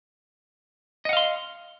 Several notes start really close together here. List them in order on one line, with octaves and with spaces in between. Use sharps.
D#5 F#5 F5 C6